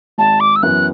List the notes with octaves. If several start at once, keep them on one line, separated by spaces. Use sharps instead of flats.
G#1 A5
D6
E6
F#2 E3 B3 F#6